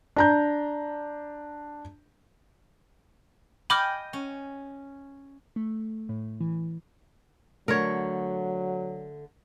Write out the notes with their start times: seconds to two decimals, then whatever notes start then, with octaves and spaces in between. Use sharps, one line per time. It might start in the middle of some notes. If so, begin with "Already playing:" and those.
0.16 D4 A#5 G6
3.70 D#5 G5 G#5 B5 D6 F6
4.13 C#4
5.56 A3
6.09 A2
6.40 E3
7.68 D3 F#3 A3 A#4 C#5